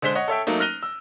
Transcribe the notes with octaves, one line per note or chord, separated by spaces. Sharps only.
D3 G#3 C5 B6 G7
C#5 D#5 F#5
A4 C#5 E5 G5
F#3 A3 A#3 D#4
F6 F#6 A#6 D#7 F7 G7
E6